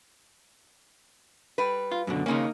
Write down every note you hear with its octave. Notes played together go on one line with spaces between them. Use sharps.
G3 B4
F4
F#2 B2 D3
F2 C#3 A#3 C#4 D#4